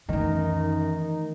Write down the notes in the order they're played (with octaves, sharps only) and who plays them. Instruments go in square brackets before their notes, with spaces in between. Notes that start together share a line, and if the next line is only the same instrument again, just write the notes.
[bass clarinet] F#2 [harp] D#3 [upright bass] E3 A3 [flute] D#4